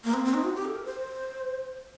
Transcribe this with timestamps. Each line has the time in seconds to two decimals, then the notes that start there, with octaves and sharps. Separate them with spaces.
0.04 A#3
0.14 C4
0.24 C4
0.34 D#4
0.44 F#4
0.55 G4
0.65 A4
0.75 A#4
0.85 C5